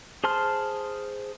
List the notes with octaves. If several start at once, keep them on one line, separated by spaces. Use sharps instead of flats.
G#4 C5 A5 C6 F6